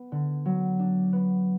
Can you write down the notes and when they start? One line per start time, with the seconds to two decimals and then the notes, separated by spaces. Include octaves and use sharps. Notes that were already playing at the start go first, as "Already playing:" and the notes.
Already playing: B3
0.12 D3
0.45 F#3
0.79 D4
1.13 B3